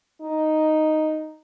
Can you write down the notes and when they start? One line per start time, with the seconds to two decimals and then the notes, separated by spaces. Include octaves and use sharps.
0.22 D#4